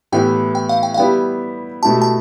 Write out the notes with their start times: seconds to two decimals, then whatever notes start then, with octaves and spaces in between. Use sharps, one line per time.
0.12 A2 E3 B3 E4 G4 G5
0.55 G5
0.69 F5
0.83 G5
0.94 F5
0.98 G3 B3 E4 G4 G5
1.83 B2 A3 E4 G4 A5
2.02 A5